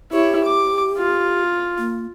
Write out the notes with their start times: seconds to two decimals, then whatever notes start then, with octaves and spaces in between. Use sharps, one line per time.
0.12 E4 G4 C#5
0.44 D6
0.98 F4
1.78 A#3